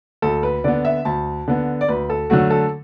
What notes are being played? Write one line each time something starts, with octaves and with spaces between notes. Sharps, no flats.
D2 A4
B4
D3 B3 D5
E5
D2 A5
D3 B3
D5
D2 B4
A4
D3 F#3 A3 F#4
A4